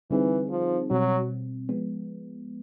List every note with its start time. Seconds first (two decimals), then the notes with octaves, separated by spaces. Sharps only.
0.11 D3 E3 G3 C4 D#4 G#4
0.50 F3
0.90 B2 F#3 G3 C4
1.69 F3 G#3 B3